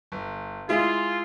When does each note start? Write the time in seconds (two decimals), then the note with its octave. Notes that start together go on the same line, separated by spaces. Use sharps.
0.12 G1
0.69 G#3 E4 F4 G#4